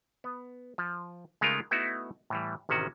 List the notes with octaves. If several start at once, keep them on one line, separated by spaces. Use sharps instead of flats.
B3
F3
C#3 G#3 A3 D#4 F4 A#4
A3 B3 D#4 E4 F#4
A2 E3 G3
A1 C3 D#3 C#4 F#4